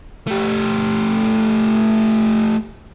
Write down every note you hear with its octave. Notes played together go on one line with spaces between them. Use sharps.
A3 G4